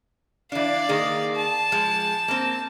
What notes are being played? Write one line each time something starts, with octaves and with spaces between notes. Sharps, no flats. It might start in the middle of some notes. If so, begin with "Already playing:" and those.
E3 D4 D5 F5
D#3 A#3 G#4
A5
F3 G#3
A#3 C4